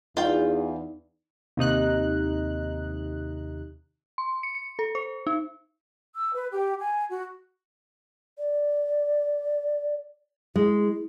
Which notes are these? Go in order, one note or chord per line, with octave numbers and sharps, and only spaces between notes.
E2 D#4 F4 D5 G5
D#2 C3 D#4 F#6
C6
C#7
C#7
A4
C5
D#4
E6
B4
G4
G#5
F#4
D5
G#3 E4